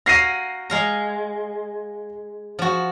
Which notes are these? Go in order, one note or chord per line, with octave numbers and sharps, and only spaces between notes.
F#4 A#4 F5 A#6 C7 D#7
G#3 F5 A#5
F3 F#4